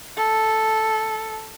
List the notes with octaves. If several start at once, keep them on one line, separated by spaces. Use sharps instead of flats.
A4